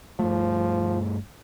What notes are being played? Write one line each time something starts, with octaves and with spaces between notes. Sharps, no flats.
G2 F3 A3